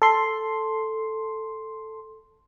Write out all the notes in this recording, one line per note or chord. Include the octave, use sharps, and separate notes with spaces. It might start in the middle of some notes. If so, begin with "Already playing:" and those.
A4 C6